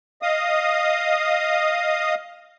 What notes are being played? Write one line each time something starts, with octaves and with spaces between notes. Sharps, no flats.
D#5 F5 D#6